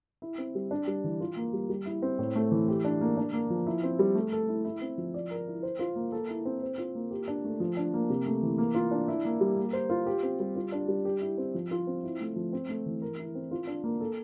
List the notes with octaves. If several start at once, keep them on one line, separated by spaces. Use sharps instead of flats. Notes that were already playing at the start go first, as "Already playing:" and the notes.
E4
C4
G3
D4
G3
E3
F4
A#3
G3
G3
E4
C4
A2
A3
E3
G4
D4
A#3
D4
A#3
F3
E4
C4
G3
A3
A4
E4
E4
C4
F3
D5
A#4
E4
C5
F4
A#3
A4
E4
C4
C5
F4
A#3
G4
D4
A3
F3
D4
A#3
C3
A3
E3
A#3
F4
D4
E4
A#3
G3
A#3
C5
F4
G4
C4
G3
F4
D4
G3
G4
E4
C4
F3
F4
C4
E4
A3
F3
C4
A3
E3
A#4
E4
C4
F4
D4
A#3
A4